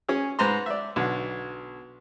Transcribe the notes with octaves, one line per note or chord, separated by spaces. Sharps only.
C#4 G#4
G#2 B4 C5 A#5 C6
D5 E5
B1 D3